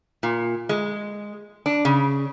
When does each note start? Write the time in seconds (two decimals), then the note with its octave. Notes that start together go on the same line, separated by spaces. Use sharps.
0.23 A#2
0.69 G#3
1.66 D4
1.85 C#3